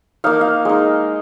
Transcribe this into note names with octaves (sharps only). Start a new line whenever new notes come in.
A#3 D#4 F5
F5
G#3 D#4